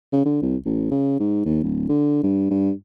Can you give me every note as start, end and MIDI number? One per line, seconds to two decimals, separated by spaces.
0.13 0.23 49
0.25 0.40 50
0.42 0.57 36
0.65 0.90 33
0.91 1.19 49
1.20 1.42 44
1.45 1.59 39
1.63 1.87 26
1.89 2.21 50
2.23 2.47 43
2.50 2.72 43